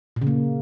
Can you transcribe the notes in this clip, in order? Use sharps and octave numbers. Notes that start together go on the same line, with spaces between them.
A#2
C#3
A#3